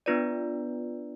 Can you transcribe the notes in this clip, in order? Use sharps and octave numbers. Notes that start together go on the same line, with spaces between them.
B3 D4 F4 B4 D5